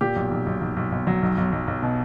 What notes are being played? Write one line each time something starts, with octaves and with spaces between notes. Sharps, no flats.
A#2 G4
B1
B1
B1
B1
B1
B1
F#3
B1
B1
B1
B1
B2